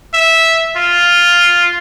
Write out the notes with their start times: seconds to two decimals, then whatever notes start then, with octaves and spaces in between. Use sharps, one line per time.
0.14 E5
0.76 F4